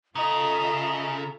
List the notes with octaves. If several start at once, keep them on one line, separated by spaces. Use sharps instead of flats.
C#3 F4 A4 D#5 E5 A#5